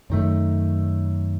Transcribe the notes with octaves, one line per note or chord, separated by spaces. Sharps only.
F#2 D#3 A3